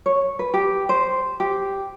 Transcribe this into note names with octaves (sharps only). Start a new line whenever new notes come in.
C#5
B4
G4
C5
G4